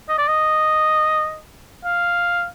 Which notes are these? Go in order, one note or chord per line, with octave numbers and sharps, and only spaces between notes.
D#5
D5
D#5
F5